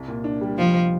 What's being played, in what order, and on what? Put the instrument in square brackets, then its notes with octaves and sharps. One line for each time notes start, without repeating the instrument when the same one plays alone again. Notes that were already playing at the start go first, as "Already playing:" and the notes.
Already playing: [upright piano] C2
A#2
D4
G3
[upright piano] F1 [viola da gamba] F3